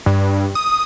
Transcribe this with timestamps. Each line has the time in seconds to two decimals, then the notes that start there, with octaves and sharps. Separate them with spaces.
0.06 G2
0.55 D#6